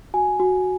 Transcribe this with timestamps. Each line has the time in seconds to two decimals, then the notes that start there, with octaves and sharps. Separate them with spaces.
0.14 F#4 G#5
0.40 F#4